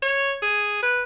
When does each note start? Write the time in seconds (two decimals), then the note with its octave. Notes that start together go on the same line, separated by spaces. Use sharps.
0.03 C#5
0.42 G#4
0.83 B4